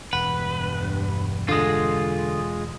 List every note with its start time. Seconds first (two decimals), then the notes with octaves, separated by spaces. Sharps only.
0.13 E1 G2 B4 F#5
1.49 D3 G#3 F4 D#6